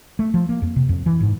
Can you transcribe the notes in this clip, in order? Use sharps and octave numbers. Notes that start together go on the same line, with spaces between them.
A3
F3
A#3
F2
C3
F2
E3
G#2